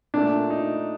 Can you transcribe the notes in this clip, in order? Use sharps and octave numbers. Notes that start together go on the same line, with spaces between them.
A#2 A3 D4
D#4